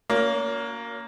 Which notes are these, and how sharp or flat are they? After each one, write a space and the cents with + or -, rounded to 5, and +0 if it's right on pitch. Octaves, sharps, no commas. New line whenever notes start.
A#3 +0 C#4 +35 F#4 -40